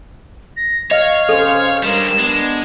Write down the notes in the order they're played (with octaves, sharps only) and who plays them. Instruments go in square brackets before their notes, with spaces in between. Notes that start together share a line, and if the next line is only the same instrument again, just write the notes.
[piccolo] A#6
[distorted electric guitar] C#5 [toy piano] D#5 [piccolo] F5
[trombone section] C3 C#4 C5 [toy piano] A4
[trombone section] G2 A#4 [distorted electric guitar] G3 G#3 [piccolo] E7
[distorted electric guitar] G#3 [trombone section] B3 D4